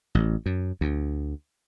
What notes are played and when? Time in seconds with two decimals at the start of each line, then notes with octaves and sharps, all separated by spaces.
0.15 A1
0.46 F#2
0.81 D2